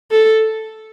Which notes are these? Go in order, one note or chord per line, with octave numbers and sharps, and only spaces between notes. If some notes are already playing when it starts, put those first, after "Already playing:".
A4